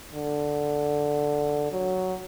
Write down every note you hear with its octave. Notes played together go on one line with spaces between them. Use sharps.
D3
F#3